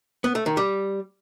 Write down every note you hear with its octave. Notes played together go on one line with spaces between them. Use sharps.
B3
A3
D#3
G3